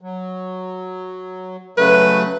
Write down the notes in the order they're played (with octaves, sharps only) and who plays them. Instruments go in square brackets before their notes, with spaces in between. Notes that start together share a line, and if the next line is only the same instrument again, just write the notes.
[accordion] F#3
[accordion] C#3 F#3 A3 [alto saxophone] B4